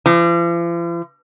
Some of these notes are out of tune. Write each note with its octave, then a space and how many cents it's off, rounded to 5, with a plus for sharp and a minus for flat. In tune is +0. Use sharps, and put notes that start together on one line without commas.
F3 -45